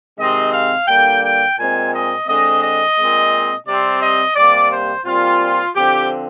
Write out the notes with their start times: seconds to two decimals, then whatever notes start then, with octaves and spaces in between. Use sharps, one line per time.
0.18 C3 D#3 G#3 C4 D#5
0.53 F5
0.88 D3 G3 A#3 G5
1.23 G5
1.58 A#2 G#3 C4 G#5
1.93 D#5
2.27 D3 G#3 C4 D#5
2.63 D#5
2.97 A#2 G#3 C4
3.67 C3 G3 C4 D5
4.02 D#5
4.36 C3 G3 A#3 D5
4.71 C5
5.05 A#2 G3 C4 F4
5.76 D3 F3 C4 G4